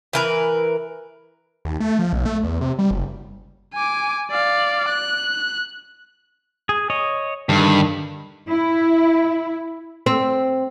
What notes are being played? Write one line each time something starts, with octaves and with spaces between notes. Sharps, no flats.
E3 A#4 B4
D#2
A3
F3
B1
A3
E2
C3
G3
F#1
G#5 D6
D5 F5
F#6
G#4
C#5 D#5
G2 D3 D#3
E4
C4